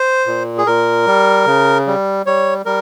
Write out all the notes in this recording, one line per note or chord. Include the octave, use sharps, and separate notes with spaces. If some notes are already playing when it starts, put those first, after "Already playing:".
Already playing: C5
A#2
G#4
A#2 A#4
G3
C#3
G3
G3 C#5
G3 A#4